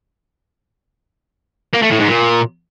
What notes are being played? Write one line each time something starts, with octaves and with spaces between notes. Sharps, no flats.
A#3
A3
A2
G#2
A#2